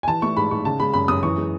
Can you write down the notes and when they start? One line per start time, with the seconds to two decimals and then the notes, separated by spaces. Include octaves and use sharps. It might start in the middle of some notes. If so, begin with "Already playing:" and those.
0.03 G#5
0.07 E3 A5
0.22 A3 C#6
0.37 G#2 B5
0.51 G#2 C#6
0.65 C#3 A5
0.80 G#3 B5
0.93 F#2 B5
1.08 F#2 D#6
1.23 E3 C#6
1.38 G#3